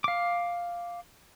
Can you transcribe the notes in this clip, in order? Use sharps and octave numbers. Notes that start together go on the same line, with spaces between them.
F5 D6